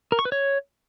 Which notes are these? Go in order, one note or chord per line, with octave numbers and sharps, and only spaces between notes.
A#4
C#6
B4
C#5